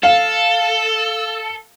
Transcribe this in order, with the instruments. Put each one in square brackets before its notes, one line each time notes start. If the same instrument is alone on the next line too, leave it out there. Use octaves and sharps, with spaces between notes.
[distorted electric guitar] A4 [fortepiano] F5